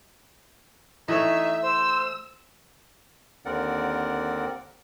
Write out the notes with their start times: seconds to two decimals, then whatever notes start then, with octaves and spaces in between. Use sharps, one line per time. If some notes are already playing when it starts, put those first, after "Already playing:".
1.08 E3 A3 D#4 C#5 E5
1.63 C5 E6
3.45 D#2 D3 C4 A#4 D5 F#5